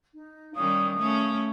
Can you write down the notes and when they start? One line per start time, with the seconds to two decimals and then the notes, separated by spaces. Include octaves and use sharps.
0.13 D#4
0.56 D#3 G3 C#4 F5 D#6
0.97 A3 C#4